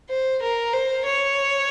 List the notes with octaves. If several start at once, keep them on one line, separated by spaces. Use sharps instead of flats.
C5
A#4
C5
C#5